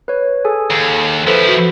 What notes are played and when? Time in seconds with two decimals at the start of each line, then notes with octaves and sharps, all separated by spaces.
0.08 B4 C#5
0.45 G#4 A4 G#5
0.70 D#2
1.27 F3 E4 A4 B4 C5
1.48 F#4